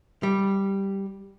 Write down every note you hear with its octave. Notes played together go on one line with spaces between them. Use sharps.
G3